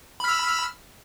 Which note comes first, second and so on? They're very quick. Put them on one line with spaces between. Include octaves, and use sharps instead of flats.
B5 F6 E6